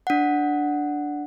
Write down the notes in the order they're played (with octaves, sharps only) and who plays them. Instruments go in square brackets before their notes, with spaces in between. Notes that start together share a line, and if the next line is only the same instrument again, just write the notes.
[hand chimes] D4 F#5